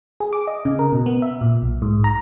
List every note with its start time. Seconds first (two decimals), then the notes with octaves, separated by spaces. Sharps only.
0.20 G#4
0.33 D6
0.47 D#5
0.65 C#3
0.79 A#4
0.92 B2
1.06 B3
1.22 E5
1.41 A#2
1.62 B1
1.82 G#2
2.04 A#5